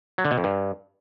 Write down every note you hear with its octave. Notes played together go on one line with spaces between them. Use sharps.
F#3
D3
B2
F2
G2